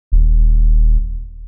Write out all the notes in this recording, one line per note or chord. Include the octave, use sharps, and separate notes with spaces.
D#1